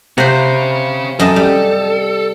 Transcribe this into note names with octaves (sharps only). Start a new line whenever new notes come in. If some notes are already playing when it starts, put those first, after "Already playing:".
C3 C#4 C5 F5 F#5
F#2 A4 D#5 A5
G3